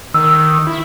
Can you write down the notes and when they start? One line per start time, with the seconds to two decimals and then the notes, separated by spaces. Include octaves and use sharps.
0.14 D#3 E6
0.67 E4